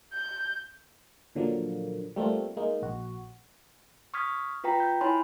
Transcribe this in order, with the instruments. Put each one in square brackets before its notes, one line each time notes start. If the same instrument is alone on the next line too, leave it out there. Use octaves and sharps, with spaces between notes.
[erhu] G6
[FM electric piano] A#2 D3 F3 F#3 A#3
G3 A3 A#3 C4 F4
G#3 A#3 D#4
A#1 F#4
[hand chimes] C#6 D#6 F6 G#6 B6
F4 B4 G5 A#5 B6
G6
E4 C#5 G#5 B5 C6